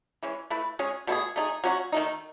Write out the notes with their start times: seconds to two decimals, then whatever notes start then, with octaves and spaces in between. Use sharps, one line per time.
0.23 E3 G#3 C#4
0.50 A3 E4 B4
0.79 G#3 C#4 G#4
1.07 B2 A3 E4 G#4
1.36 A3 D#4 G#4
1.64 F#3 C#4 F#4
1.92 D#3 A3 D#4